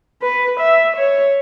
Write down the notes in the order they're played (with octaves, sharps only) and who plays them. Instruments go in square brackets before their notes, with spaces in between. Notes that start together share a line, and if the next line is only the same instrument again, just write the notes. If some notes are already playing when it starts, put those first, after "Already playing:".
[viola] B4
E5
C#5